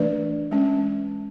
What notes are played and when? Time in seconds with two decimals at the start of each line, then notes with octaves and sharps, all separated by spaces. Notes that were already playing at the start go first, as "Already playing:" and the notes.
Already playing: E3 A3 D4 B4 D5
0.51 G#3 C#4